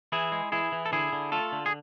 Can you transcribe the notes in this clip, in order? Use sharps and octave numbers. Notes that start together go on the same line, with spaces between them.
E3 E4 G#4
G#3
E3 E4 G#4
E3
A4
D3 E4 G#4
D3
A3 F4 A4
D3
G#4